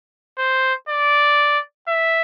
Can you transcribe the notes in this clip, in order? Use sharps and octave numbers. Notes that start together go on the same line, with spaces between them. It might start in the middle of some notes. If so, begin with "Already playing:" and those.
C5
D5
E5